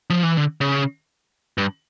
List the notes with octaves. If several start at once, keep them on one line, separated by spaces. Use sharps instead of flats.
F3
E3
D3
C#3
G2